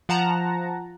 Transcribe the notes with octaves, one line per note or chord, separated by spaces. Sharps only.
F3 F#5 A5 A#5